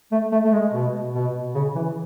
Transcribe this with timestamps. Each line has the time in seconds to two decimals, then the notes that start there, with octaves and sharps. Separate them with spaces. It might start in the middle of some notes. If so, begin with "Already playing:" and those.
0.12 A3
0.32 A3
0.44 A3
0.52 G#3
0.73 B2
1.14 B2
1.55 C#3
1.75 E3